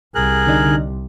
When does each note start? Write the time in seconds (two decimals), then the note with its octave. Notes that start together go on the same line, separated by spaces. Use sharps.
0.15 C2 G#4 A#4 F#6
0.47 D3 D4 D#4